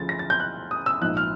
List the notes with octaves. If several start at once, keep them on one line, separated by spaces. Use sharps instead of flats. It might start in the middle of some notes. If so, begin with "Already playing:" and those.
Already playing: D2 C#3 F3 A3 A6
A#6
A6
G6
F#6
D#6
E6
A#1 G#2 F3 F#6
F6